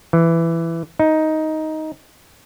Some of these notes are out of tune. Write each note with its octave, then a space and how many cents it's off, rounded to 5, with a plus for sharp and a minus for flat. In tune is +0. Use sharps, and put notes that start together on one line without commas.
E3 +10
D#4 +10